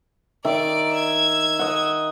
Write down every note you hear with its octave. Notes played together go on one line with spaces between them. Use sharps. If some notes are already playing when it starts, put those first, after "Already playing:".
D#3 D5 E5 D7
E6 G#6
D#5 F#5